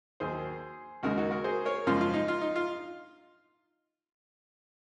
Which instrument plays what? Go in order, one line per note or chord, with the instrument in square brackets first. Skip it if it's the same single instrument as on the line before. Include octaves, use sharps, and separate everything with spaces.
[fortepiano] D#2 D#3 F#3 G#4 C5
D#2 C#3 G#3 F#4 A#4
D#4 F#4
F#4 A#4
G#4 C5
A#4 C#5
F#2 C#3 F3 G#3 F4
F4
D#4
F4
D#4
F4